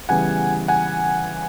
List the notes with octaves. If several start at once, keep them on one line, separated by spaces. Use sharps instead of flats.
C#3 E3 G3 B3 F#5 G#5
F#5 G#5